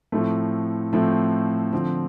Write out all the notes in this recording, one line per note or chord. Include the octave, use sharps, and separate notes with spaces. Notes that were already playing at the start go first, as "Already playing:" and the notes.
A2 F3 A3 C4
A2 F3 A3 C4
D3 F3 C4